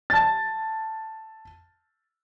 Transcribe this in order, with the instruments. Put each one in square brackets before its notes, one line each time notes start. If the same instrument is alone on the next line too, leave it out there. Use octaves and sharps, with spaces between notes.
[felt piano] A5 A6